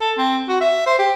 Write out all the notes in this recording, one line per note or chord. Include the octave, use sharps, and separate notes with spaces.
A4
C4
F#4
E5
C5
G4